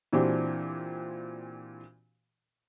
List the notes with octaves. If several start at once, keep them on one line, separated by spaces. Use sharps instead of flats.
A#2 E3 C4 D4 F#4 G4